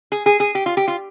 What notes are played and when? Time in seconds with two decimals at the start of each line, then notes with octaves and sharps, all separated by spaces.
0.12 G#4
0.26 G#4
0.40 G#4
0.55 G4
0.66 F4
0.77 G4
0.88 F4